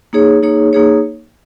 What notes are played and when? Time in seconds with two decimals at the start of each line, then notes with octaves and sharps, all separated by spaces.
0.13 A#3 D#4 G#4 C#5
0.43 A#3 D#4 G#4 C#5
0.73 A#3 D#4 G#4 C#5